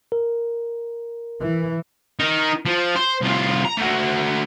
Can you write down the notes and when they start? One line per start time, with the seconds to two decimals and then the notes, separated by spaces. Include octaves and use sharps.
0.12 A#4
1.41 E3
2.19 D#4 A#4
2.66 F3
2.95 C5
3.21 C2 F4
3.65 A#5
3.77 A3 F#4